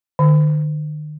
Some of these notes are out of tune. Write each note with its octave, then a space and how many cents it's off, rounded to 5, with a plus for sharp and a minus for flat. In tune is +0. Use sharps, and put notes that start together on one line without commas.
D#3 -45